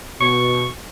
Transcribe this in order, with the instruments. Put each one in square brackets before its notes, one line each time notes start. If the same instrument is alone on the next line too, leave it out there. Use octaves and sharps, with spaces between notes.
[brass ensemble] B2 [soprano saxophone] C#6